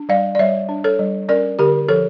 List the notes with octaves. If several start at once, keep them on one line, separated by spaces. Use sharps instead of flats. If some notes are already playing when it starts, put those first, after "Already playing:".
Already playing: D4
G3 D5 F5
D5
G3 C#5 E5
D4
A4 C#5
G3
C#4 A#4 D5
D3 G4 A#4
F3 A4 C#5